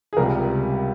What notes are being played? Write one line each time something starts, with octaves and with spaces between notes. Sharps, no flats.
G#4
C#2 C3 G3 A#4